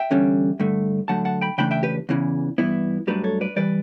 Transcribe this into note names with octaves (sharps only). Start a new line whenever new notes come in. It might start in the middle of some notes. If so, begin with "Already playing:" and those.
Already playing: E5 G5
E2 D3 G3 C#4
G2 D3 A3
D3 F#3 A3 F#5 A5
F#5 A5
G5 B5
C#3 E3 A3 D4 G5 B5
E5 G5
G4 B4
E2 C#3 E3
G2 E3 B3 E4
G2 F#3 A3 D4 G4 B4
A4 C#5
B4 D5
E3 G3 B4 D5